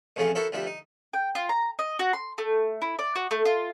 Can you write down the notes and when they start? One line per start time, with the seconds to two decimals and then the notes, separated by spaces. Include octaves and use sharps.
0.16 A1 F2 C#3 A3 C#4 F5
0.35 E4 F#4 A4 A#4 C5 E5
0.52 D2 F3 G3 E5
0.67 D#4
1.13 G5
1.35 F4
1.49 A#5
1.79 D#5
1.99 F#4
2.13 C6
2.38 A3
2.82 E4
2.99 D5
3.16 F#4
3.31 A3
3.45 F4